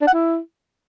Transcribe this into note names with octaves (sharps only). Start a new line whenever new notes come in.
D4
F#5
E4